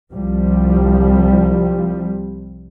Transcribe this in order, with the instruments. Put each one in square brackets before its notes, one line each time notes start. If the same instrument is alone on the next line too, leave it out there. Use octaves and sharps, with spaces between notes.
[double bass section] C2 F3 G3